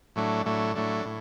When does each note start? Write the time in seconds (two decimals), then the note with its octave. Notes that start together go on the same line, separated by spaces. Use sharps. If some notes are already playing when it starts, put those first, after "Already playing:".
0.16 A2 F#3 A3 D4
0.46 A2 F#3 A3 D4
0.75 A2 F#3 A3 D4
1.05 A2